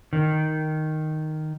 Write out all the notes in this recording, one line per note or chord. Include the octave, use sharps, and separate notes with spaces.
D#3